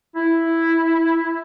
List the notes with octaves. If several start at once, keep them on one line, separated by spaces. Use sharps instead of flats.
E4